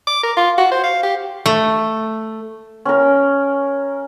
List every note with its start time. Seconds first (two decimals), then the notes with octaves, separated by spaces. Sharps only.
0.07 D6
0.23 A#4
0.37 F4
0.58 F#4
0.71 C5
0.83 F5
1.03 G4
1.46 A3
2.85 C#4 A#4